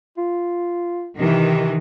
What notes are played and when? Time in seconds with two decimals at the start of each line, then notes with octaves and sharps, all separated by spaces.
0.18 F4
1.20 C3 D#3 E3